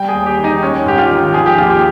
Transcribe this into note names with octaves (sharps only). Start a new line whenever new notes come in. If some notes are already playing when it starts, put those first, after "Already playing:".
Already playing: G3 G5
D#2 G#4
G4
D#3
D#4
G#3 C#4
G#2 G4
F4
D#3
F3 G#4
G4
D#2 F4
G4